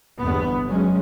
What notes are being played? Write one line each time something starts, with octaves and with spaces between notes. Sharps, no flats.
G1 E2 B3
F#3 G#3 C#4